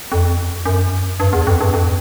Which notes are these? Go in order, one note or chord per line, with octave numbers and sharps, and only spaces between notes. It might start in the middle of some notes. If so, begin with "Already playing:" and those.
F2
F#2
G2
E2
F2
G2
F2